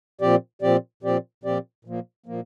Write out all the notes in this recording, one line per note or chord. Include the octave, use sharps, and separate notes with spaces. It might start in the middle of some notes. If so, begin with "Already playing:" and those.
A#2 F3 C4 G4 D5
A#2 F3 C4 G4 D5
A#2 F3 C4 G4 D5
A#2 F3 C4 G4 D5
A#2 F3 A#3
A#2 F3 A#3